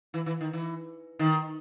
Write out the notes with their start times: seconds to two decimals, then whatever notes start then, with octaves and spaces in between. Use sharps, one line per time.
0.14 E3
0.26 E3
0.41 D#3
0.53 E3
1.19 D#3